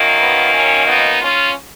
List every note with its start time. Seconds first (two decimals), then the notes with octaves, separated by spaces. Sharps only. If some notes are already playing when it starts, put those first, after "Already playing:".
Already playing: F#2 D#3 A#3
0.20 B3
0.54 C#4
0.87 B3 D#4
1.22 C#4 F4